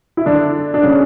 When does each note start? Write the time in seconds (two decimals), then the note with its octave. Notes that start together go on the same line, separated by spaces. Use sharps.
0.17 E4
0.26 D3 D4
0.74 D4
0.83 C#3 C#4